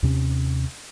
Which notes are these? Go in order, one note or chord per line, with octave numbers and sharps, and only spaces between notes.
D#2 C3 C#4